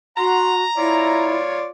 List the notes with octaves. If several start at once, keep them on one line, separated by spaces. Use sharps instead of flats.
F#4 F#5 A#5 C6
E4 F4 C#5 D5